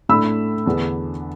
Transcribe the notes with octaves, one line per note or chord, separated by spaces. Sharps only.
A2 A3 D4 B5 E6
E2 D3 B3 D4